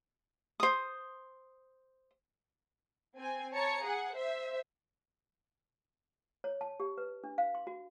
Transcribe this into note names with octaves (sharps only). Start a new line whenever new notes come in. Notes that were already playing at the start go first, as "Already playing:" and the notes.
C5 D#6
C4 G#5
C#5 A5 A#5 C#7
G#4 F#5
C5 E5
C#5
A5
G4
B4
D4
F5
C6
F#4